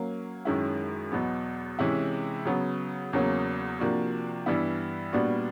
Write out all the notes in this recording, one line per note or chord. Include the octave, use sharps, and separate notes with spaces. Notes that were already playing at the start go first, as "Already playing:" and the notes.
Already playing: F#3 A#3 C#4
F#2 D#3 G#3 C#4 E4
E2 B2 F#3 B3
C3 E3 G#3 C#4 E4
C#3 F#3 B3
E2 C#3 F#3 A#3 C#4
C3 F3 A#3 D4 F#4
G2 E3 G3 B3 E4
A#2 G3 B3 D4 F#4